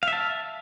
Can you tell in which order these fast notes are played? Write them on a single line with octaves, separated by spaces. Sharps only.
F5 E5 A5